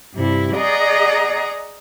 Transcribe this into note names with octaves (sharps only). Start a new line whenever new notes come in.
G2 C3 E4
G#4 D5 D#5 F#5 A#5